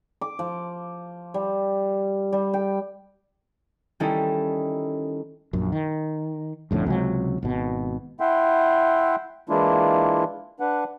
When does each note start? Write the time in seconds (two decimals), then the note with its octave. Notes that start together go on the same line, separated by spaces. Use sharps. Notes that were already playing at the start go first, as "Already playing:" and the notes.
0.21 D6
0.39 F3
1.34 G3
2.33 G3
2.54 G5
4.00 D#3 G3 C#4 D#4 E4 A4
5.53 A#1 F#2
5.72 D#3
6.71 A1 F2 A2 D3
6.86 C#2 C3 F#3
7.43 G#1 B2
8.20 E4 E5 F#5 G5 C6
9.49 E3 G#3 A#3 D4 E4 F4
10.60 D4 B4 F#5